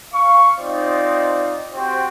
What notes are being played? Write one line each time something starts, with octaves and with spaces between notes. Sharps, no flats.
F5 C#6
C4 D#4 F4 C5 D5 D#5
C4 F#4 G4 C5 G5